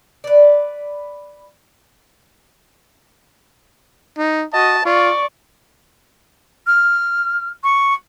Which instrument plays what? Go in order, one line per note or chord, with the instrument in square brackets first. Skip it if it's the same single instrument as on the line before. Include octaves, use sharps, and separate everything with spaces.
[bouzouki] B4 D5
[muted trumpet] D#4
[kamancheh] F#4 D#5 [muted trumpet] A5
[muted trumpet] F4 [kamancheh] D5 C#6
[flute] F6
C#6